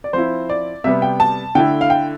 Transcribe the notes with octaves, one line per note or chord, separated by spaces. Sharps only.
D5
F3 C4 E4 C5
D5
C3 G3 B3 E5
G5
A5
D3 A3 E4 G5
F5
G5